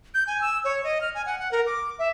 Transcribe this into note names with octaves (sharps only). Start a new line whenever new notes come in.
G6
G#5
E6
C#5
D#5
F6
G#5
F#5
F#5
A#4
D6
E5